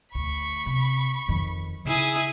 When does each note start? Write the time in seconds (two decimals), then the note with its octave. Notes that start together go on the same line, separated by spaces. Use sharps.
0.15 D2 B5 C#6
0.66 C3
1.28 F2 D#3
1.85 C#3 D#4 E4 G#4 G#5